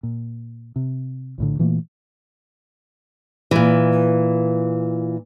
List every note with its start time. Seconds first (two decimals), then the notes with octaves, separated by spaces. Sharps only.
0.03 A#2
0.76 C3
1.38 A#1 A2 D3
1.59 A#2 E3 A3 A#3
3.51 A#2 E3